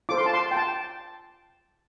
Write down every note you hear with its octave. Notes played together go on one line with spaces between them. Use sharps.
F4 A4 C5 D6
C6
A5
C6
G5
A5